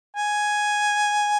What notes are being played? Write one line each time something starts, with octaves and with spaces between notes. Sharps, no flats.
G#5